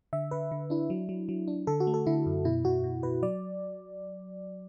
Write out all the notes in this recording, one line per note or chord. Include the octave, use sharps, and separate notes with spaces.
D3 E5
D3 B4
D3
D4 E4
F#3
F#3
F#3
D4
D3 A4
F#4
A3
A4
D3 E4
F#2
B2 E4
B2 F#4
B2
B2 B4
F#3 D5